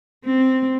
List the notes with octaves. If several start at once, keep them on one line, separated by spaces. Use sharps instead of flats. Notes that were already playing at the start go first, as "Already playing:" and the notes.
C4